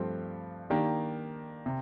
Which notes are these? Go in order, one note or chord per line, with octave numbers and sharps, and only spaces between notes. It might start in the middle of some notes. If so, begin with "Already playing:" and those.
Already playing: G2 F3 A3 C4 G4
D#3 A#3 D4 G4
C3